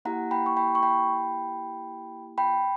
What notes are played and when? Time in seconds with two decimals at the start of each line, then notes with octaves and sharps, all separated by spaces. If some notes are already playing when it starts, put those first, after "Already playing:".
0.05 A#3 E4 G4 F#5 A#5
0.31 G5 B5
0.46 C#6
0.57 G5 B5
0.75 C#6
0.83 G5 B5
2.38 G5 B5